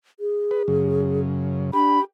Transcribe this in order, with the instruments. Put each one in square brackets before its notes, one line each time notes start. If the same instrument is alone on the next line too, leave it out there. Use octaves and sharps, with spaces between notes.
[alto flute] G#4
[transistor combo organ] B4
F#2 C#3
[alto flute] D4 [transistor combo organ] G4 [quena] B5